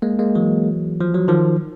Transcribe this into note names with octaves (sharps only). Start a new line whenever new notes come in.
G#3 A#3
G#3 A#3
E3 F#3
F3
F#3
D#3 F3